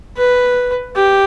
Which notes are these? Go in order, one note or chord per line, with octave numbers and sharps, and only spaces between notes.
B4
G4